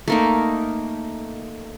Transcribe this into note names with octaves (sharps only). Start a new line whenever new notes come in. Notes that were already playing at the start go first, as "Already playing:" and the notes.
A3 A#3 D#4